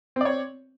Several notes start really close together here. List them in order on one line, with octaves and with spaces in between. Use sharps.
C4 D5 C#5